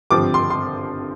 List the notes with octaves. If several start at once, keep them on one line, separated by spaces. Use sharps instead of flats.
G#1 G2 D3 F3 C4 D6
C6
C6